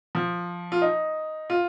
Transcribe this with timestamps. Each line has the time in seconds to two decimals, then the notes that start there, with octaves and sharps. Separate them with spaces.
0.15 F3
0.72 F4
0.82 D#4
1.50 F4